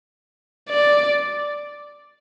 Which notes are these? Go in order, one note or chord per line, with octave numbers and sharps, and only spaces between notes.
D5